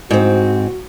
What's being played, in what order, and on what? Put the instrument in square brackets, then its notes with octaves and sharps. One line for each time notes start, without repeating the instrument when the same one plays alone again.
[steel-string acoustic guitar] G#2 C4 [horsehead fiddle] F#4